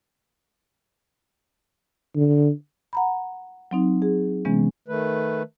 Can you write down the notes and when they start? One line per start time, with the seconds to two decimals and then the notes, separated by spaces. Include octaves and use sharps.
2.16 D3
2.93 F#5 A#5 B5
3.71 F#3 C4 D#4
4.02 G#4
4.45 C3 E3 G#3 B3 C#4
4.88 D#3 A3 B4